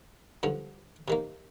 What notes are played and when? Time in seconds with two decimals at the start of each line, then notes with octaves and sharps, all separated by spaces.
0.43 G2 D3 F3
1.08 C3 D#3 A#3